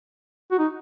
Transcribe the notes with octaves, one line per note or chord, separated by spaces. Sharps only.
F#4
D#4